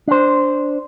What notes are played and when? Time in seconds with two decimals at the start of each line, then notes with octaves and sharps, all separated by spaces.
0.08 D4 C5